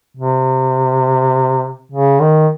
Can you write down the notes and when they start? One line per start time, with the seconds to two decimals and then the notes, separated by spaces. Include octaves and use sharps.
0.17 C3
1.92 C#3
2.21 D#3